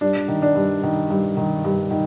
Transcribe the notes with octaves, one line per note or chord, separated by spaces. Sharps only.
G2 D4
D#3
D4
G2
D#3
G2
D#3
G2
D#3